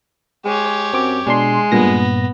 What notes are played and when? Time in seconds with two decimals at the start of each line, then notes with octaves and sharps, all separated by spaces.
0.45 G#3 G4 C#5
0.93 F#2 C4 D6
1.27 B2 G#3 D4 C6
1.72 G2 A#2 B3 A#6